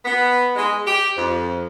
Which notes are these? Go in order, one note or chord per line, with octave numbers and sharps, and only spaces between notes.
B3
G#3
G4
F2